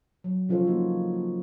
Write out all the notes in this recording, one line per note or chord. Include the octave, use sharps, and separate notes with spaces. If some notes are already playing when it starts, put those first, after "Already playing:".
F#3
C#3 F3 F4 A4 C5 C#5
A#3 D#4 F#4
A#3